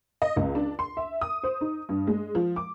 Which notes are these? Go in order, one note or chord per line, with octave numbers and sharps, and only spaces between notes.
D#5
C#2
D4
C6
E5
D#6
C5
D#4
G2
G#3
F3
D6